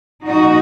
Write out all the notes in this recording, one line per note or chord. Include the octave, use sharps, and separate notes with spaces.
A#2 F3 D#4 F#4